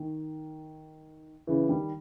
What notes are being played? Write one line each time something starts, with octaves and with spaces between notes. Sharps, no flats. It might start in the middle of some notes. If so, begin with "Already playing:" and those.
Already playing: D#3
C#3 E3
D#3 G3